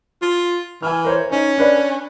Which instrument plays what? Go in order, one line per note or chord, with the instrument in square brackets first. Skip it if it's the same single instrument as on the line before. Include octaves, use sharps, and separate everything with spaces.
[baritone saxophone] F4
[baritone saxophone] E3 [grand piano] G#5 F6
[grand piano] A#4 C5 C#5
[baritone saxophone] C#4 [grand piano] D#4
[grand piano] D4 B4 D5